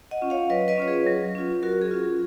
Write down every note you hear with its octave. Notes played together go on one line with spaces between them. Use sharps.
D#5 F#5
C#4 F4
C#5 F5
F#3 B4 D#5
B4 D#5
C#4 F4 C#5
G#4 B4
F#3
C#4 F4
F#3 F#4 A#4
G#4
C#4 F4